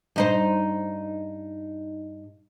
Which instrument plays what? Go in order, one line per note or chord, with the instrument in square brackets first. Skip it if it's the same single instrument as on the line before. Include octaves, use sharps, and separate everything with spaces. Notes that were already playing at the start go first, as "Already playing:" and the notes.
[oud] G2 D#4 C5